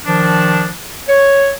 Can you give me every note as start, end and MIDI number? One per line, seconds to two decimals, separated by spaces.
0.05 0.68 51
0.05 0.68 53
0.05 0.68 62
1.08 1.50 73